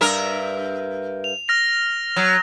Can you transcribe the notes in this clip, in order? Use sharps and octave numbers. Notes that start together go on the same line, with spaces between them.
G2 A#4 E5
F7
F6 A#6 F7
F#3